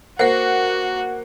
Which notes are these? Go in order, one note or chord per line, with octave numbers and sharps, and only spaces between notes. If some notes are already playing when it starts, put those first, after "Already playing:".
A#3 F#4 A#4 C5 F#5